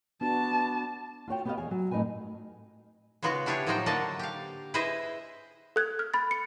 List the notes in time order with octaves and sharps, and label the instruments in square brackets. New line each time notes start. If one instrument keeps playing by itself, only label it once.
[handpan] B3 D4 F#4 [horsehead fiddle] A5
[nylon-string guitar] F4 F#4 C#5 G5
B3 G4 B4 D5 D#5 F5
E2 G#4 F5 G#5
F#3 G#5
F2 A2 D#4 A#4 B4 G#5
[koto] C#3 G#3 B3 F4 F#4
D4 E4 G4 G#4 C#5
A2 F3 F#3 D#4 C5 G5
D3 F#3 A#3 D4 D#5 A5
G4 F5
E4 G#4 B4 C5 D#5 E5
[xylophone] A4 F#6 G#6
F6
B5 A6
C#7